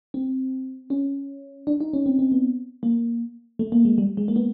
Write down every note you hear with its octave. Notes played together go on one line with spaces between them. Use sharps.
C4
C#4
D4
D#4
C#4
C4
C4
B3
A#3
A3
A#3
G#3
G3
G#3
A#3
B3